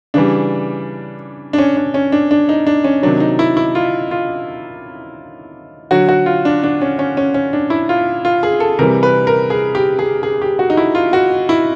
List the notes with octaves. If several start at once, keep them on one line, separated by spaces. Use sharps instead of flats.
C#3 E3 G3 D4
D4
C#4
D4
C#4
D4
D4
D#4
D4
C#4
C3 D#3 F#3 D4
D#4
E4
E4
F4
F4
D3 F#3 F#4
F#4
F4
D4
D4
C#4
C#4
C#4
C#4
D4
E4
F4
F4
G#4
A4
C3 E3 G3 A#4
B4
A#4
G#4
G4
G#4
G#4
G4
F#4
D#4
E4
F4
F#4
E4